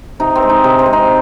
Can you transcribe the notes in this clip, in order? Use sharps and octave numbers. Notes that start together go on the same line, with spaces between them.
C3 D#4
C4
G#3
D#4
C3 D#4
C4
G#3
D#4